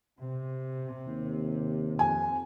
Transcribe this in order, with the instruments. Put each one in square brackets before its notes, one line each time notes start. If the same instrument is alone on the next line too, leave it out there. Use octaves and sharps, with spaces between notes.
[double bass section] C3
[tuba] D#2
[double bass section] F2 [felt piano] G#5